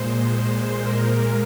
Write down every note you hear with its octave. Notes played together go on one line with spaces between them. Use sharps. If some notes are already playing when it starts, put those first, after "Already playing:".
Already playing: A#2 G#3 C5
A#4